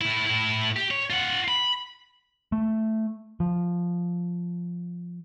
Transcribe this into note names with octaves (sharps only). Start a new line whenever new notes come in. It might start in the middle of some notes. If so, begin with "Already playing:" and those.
A2 E4
A2 E4
G4
C#5
F4 F#5
B5
A3
F3